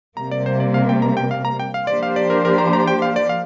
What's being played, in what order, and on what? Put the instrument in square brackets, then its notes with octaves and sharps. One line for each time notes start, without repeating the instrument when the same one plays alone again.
[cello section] C3 G3 A#3 [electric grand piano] A#5
[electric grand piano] D5
C5
D5
F5
G5
A#5
G5
F5
A#5
G5
F5
[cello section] F3 A#3 D4 G4 C5 [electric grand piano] D5
[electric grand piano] F5
D5
A#4
A#4
A#5
A#5
G5
F5
D5
F5